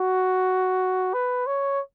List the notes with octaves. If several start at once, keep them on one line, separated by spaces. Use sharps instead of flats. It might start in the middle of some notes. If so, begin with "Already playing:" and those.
Already playing: F#4
B4
C#5